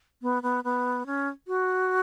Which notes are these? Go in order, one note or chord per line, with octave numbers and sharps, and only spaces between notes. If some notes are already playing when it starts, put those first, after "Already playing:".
B3
B3
B3
C#4
F#4